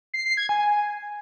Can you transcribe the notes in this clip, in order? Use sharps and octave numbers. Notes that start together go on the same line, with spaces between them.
C7
C7
G#6
G#5